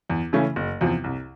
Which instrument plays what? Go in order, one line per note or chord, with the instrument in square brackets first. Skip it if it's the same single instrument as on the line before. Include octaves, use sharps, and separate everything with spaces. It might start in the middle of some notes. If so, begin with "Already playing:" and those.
[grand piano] E2
C#3 E3 A3 C#4
F#1
E2 C3 F3
C2